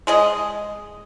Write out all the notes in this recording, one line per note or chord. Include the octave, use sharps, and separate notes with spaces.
G#3 G#4 D#5